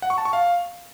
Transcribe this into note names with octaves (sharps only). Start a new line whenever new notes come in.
F#5
C#6
A5
C#6
F5